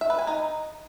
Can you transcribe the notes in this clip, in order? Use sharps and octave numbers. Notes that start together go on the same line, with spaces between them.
E5
B4
G#5
D#4